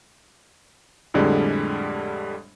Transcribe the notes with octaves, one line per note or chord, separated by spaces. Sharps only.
F2 A2 D3 G3 G#3